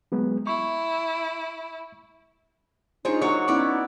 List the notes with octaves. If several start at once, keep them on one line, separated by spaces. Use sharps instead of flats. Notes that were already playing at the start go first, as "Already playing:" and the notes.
F#3 G#3 B3
E4 C#6
G#3 D4 D#4 F4 C5 C#5
F#3 A#3 F#4 C#5
B3 C#4 D#4 E4 D5 D6